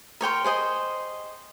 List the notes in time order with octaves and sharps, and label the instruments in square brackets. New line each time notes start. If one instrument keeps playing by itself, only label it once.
[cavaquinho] A#4 C#5 G5 C6
G#4 C5 D#5 G5